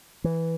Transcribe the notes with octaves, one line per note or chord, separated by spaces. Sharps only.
E3